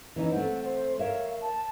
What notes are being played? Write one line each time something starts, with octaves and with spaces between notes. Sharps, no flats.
E3 C#4 D#4
A3 C4 F#5
C5
A#4 C#5 E5 F5
A5